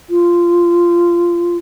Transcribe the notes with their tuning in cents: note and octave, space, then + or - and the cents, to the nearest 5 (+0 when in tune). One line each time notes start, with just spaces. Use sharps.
F4 -15